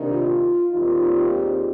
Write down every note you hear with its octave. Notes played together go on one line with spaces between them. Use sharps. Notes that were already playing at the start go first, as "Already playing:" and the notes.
Already playing: C3 D#3 A#3 D4
F4
D#2 D#3 G3 C4 D#4 F4
F4 G#4